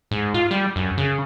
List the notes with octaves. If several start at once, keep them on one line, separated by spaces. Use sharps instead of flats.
G#2
F4
G3
F#2
C#3